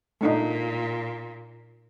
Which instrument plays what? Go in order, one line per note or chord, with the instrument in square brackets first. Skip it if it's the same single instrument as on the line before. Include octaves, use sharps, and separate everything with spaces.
[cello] A#2 [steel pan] A3 D4 D#4